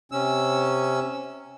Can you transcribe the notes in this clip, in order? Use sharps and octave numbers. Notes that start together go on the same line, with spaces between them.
C3 C#4 E6